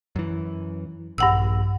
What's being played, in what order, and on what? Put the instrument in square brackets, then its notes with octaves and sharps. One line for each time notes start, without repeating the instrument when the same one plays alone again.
[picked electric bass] F#2 E3
[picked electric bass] A#1 [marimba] G2 F#5 E6